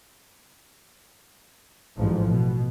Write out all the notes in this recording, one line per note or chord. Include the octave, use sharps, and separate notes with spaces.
A1 G#2 F3
B2